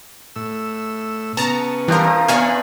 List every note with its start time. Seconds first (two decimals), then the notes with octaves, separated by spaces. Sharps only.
0.36 A2 E6
1.37 C#3 B3 A5 A#5
1.88 E3 F3 G3 C4 D4 A#4
2.04 C4 A#5 D#6
2.28 E2 B3 D4 F5 G#5 C#6